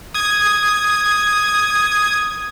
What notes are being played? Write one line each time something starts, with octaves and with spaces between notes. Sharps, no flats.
D#6 G#6